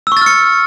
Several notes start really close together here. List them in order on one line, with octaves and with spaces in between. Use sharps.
E6 C#6 A6 F6 C#7